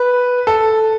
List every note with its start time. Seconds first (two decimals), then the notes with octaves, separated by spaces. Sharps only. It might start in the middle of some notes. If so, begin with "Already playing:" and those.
Already playing: B4
0.47 A4